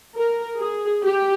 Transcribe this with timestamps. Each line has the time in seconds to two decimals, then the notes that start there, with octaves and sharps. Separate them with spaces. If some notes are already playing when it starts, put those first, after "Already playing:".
0.16 A#4
0.59 G#4
1.02 G4